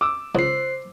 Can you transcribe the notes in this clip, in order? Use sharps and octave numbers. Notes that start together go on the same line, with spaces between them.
D6 E6
C#2 C5 C7